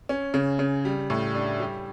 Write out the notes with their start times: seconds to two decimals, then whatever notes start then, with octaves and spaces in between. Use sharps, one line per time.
0.09 C#4
0.34 C#3
0.59 C#3
0.85 G3
1.10 A2
1.35 D4
1.59 G3